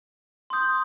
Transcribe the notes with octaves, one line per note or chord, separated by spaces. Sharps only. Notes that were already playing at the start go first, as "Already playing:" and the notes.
C6 D#6 G6